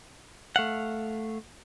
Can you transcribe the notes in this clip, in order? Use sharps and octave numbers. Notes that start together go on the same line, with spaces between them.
A3 F5 F#5